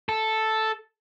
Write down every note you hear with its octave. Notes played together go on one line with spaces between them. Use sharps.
A4